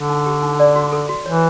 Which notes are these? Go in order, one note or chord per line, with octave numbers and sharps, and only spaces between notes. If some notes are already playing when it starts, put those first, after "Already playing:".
Already playing: D3
D#4
G4
D#4
D5
F#4
A4
F#4
E3 C#5